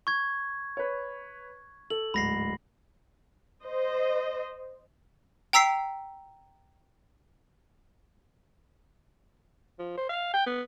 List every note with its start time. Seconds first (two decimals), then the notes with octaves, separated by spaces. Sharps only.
0.07 C#6 G#6
0.77 B4 C#5
1.90 A4 F#7
2.14 D1 G#2 B5 A#6 C7
3.64 C5 D#5
5.53 G5 A#5 E6 B6 C7
9.79 F3
9.97 C5
10.09 F5
10.34 G5
10.46 B3